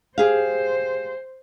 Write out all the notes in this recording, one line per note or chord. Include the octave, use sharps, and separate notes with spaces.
G4 G#4 C5 F5